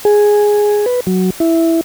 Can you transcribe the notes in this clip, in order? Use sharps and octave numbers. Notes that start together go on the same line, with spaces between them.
G#4
B4
F#3
E4